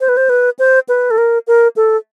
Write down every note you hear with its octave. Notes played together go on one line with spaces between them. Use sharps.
C5
B4
C5
B4
C5
B4
A4
A#4
A#4
A4